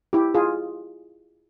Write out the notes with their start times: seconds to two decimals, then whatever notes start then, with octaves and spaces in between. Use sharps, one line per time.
0.13 E4 G4
0.35 F4 G#4